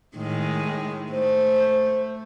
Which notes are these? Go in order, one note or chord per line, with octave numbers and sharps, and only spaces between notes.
A2 D#3 G#3
A3 C5